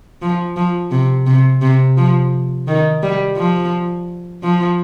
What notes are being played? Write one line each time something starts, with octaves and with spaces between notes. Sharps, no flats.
F3
F3
C3
C3
C3
F3
D#3
G3
F3
F3